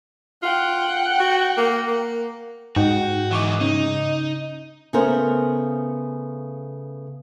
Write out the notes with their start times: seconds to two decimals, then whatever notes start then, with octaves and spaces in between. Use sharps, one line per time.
0.43 F4 F#5 G5
1.20 F#4
1.57 A#3
1.87 A#3
2.76 G#2 F#4 G5
3.31 E3 D#4 F#5 C#6 D6
3.61 C#3 C#4 D#4
4.93 C#3 A3 B3 A#4 C5